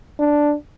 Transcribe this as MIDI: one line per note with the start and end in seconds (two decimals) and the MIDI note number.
0.19 0.54 62